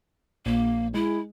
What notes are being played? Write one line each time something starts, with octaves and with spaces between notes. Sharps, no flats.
A#1 A#3
G#3 E4